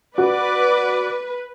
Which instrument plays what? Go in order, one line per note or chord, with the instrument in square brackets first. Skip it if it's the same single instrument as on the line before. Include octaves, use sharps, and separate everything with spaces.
[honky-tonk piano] F#4 [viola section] B4 [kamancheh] D5 D6